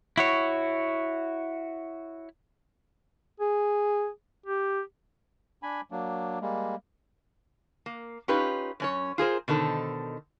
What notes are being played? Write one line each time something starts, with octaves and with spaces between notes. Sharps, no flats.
E4 F#4 C#5
G#4
G4
D4 G#5 B5
F#3 A#3 D4
G3 G#3 A#3
A#3
C#4 D#4 F4 G4 B4
F#2 C#4 C#5
F4 G#4 A#4 C5
B2 D3 D#3 A4 C5